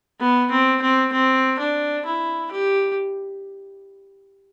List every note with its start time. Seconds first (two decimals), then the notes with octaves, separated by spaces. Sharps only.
0.20 B3
0.51 C4
0.81 C4
1.13 C4
1.59 D4
2.05 E4
2.52 G4